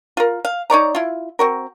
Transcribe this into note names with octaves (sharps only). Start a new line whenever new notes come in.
F4 A#4
F5
D#4 C#5 D5 A#5
E4 F4
C4 F#4 A#4